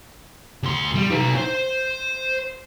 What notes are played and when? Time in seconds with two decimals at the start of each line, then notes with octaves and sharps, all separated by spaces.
0.63 D2 C6
0.95 G3
1.11 D#4 B4
1.36 C5